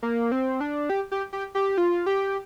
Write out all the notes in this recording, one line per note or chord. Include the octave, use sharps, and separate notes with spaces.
A#3
C4
D4
G4
G4
G4
G4
F4
G4